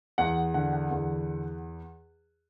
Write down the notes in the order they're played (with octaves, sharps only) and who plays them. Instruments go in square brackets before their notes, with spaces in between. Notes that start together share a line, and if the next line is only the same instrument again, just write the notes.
[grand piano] E2 F#5
D3 F#5
F#5
E2